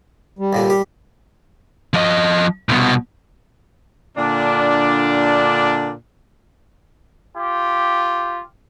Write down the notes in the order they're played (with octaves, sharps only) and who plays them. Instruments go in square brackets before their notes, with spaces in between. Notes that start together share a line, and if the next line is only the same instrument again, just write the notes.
[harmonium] G3
[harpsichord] D#2 A#2 D3
G4
[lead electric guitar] F3 D#5
C2 B2
[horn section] A#2 D3 D4
[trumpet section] F4 G4